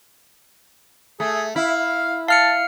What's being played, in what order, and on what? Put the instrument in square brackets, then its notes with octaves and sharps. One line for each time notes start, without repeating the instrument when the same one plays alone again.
[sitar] A3 [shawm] G#4
[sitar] E4 [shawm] F5
[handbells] F5 F6 C#7 [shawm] A5